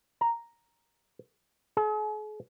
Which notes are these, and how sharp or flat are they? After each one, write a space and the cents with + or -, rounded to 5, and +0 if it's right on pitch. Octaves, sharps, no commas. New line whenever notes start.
A#5 +0
G#4 +45